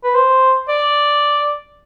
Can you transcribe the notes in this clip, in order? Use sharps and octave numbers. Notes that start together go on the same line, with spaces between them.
B4
C5
D5